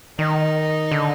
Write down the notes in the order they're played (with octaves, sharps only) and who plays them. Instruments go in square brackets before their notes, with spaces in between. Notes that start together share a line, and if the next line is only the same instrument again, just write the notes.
[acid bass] D#3 [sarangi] D#4
[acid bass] D3